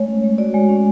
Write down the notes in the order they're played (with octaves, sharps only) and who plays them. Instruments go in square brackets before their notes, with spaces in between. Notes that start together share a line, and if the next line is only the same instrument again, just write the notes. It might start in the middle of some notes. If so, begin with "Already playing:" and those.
Already playing: [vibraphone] G#3 A3 C#5
C#4
G#3
F#4 D5
G#3
C#4